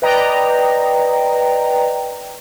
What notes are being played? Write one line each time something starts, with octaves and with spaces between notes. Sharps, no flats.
B4 D5 D#5 G5 A#5